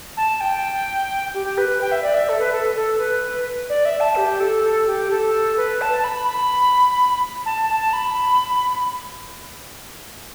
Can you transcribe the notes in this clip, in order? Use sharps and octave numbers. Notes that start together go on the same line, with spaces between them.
A5
G5
G4
B4
G5
E5
D5
E5
A4
B4
A4
A4
B4
D5
E5
A5
G4
A4
A4
G4
A4
B4
A5
B5
B5
A5
A5
B5